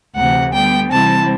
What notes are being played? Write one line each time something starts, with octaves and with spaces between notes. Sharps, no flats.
D2 C3 E3 A3 F#5
D3 G3 B3 G5
C3 E3 G3 C4 E4 A5